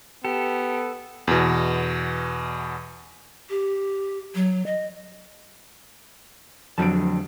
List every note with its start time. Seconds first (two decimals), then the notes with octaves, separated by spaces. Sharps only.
0.25 B3 G4 A4
1.27 E2 B2
3.50 G4
4.35 F#3
4.66 D#5
6.78 F2 D3 F#3 A5 D7